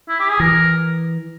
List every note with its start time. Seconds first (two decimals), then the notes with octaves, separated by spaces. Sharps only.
0.08 E4
0.19 G4
0.29 G#4
0.40 E3 A#4